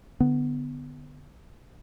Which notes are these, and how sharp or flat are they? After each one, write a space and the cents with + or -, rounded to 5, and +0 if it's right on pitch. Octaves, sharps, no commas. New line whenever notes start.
D3 +0 B3 +10